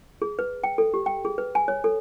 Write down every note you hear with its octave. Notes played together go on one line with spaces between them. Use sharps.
G#4
B4
G5
A4
G4
G5
G#4
B4
G#5
C#5
A4